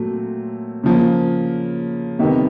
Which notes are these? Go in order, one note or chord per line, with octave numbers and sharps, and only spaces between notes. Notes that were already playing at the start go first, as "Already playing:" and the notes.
Already playing: A#2 F#3 A3 C4
C#3 F3 A#3
F2 C3 D#3 G3 B3